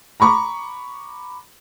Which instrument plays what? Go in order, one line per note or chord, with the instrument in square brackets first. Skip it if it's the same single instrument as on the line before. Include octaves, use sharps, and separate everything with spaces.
[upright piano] A#5 B5 C#6 D6